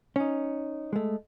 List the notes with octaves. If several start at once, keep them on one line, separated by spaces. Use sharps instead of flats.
C#4 D#4
G#3 A3